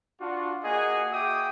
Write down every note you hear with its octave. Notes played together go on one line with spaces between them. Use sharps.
D4 F4 F#4
A#3 F#4 G#4 D#5 F#5 G#5
F#4 G#4 E5 G5 D6 D#6